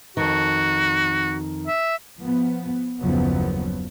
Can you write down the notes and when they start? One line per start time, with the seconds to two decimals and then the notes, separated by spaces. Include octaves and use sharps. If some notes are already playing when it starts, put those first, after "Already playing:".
0.17 F2 D#3 F#4
1.67 E5
2.21 F3 B3
3.02 F#1 D#2 F3 F#3 B3